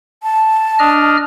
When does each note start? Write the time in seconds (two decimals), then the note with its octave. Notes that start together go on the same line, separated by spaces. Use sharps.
0.23 A5
0.79 D4 D#5 F6